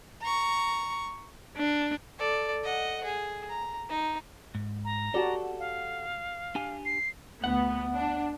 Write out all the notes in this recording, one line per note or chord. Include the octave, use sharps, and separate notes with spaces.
A#5 C#6
D4
A4 D5
D#5 F#5
G#4
A#5
D#4
G#2
A#5
F#4 G4 A4 D5 F#5 A5
F5
D4 G4 G#5
C7
D2 B3 F#5
D4